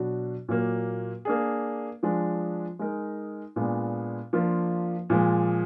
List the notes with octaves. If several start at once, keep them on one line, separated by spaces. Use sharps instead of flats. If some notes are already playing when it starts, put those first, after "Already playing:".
Already playing: B2 F#3 D4 F#4
A#2 F#3 A#3
A#3 D4 G#4
F3 G#3 D4
G#3 D#4 A#4
A#2 G#3 B3 D4
F3 A#3 D4 F4
A#2 F3 G#3